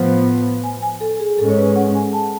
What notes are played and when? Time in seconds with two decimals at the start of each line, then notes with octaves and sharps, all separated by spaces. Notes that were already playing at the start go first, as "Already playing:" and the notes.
Already playing: A2 F3 B3
0.64 G#5
0.82 G#5
1.01 A4
1.20 G#4
1.38 G#2 G#3 C#4 A4
1.49 C#5
1.57 B4
1.76 F#5
1.95 G#5
2.13 A5